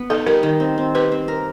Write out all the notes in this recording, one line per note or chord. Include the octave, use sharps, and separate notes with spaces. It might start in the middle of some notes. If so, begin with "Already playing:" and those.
Already playing: B3
D#4 A4
G3 A#4
D#3
C4
C4
G4 B4
C4
A#4